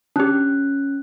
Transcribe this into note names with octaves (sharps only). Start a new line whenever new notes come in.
C#4 D4 G4 F#6